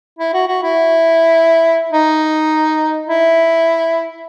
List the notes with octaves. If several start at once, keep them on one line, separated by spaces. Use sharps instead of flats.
E4
F#4
F#4
E4
D#4
E4